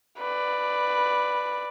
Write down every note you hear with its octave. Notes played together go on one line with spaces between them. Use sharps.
B4 D5